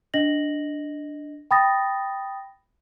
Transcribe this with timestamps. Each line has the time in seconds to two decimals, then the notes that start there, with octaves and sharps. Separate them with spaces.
0.14 D4 D#5 A#6 F#7
1.51 G5 B5 D#6 A6 A#6